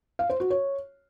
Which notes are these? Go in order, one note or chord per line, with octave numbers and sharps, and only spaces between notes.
F5
C5
F#4
C#5